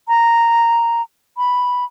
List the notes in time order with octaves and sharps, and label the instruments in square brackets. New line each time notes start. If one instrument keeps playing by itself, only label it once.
[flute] A#5
B5